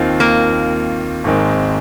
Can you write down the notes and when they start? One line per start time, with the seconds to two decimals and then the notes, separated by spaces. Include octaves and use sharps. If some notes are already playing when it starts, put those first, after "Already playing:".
Already playing: D#2 D#3 C4 F4
0.20 A#3
1.24 G#1 G#2 D#3 G#3 C4